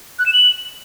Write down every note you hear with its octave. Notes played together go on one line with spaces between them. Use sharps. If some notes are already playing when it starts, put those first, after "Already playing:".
F#6
E7
F#7